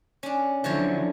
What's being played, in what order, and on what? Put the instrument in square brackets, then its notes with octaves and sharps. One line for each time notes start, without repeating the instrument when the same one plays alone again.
[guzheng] C#4 D4
[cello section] D3 F#3 E4 [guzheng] F3 F#4 C#5